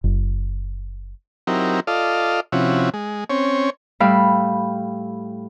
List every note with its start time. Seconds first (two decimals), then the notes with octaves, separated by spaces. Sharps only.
0.04 F#1
1.47 F#3 C4 D#4 E4 G4 A#4
1.87 F4 A4 D5 D#5 F5
2.52 C3 F3 C#4 E4 F#4
2.94 G#3
3.30 C4 C#4 C#5
4.00 A2 G3 F5 G5 B5 E6